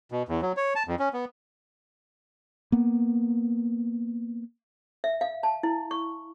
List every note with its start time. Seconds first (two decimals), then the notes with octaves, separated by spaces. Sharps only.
0.12 B2
0.29 E2
0.42 F#3
0.57 C#5
0.76 A5
0.88 F2
0.99 C#4
1.13 B3
2.72 A#3 B3
5.04 E5
5.21 F5
5.43 A5
5.63 E4
5.91 C#6